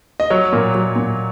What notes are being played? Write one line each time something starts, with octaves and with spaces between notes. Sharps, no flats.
D#5
F#3 C#5
A#2
F#3
A#2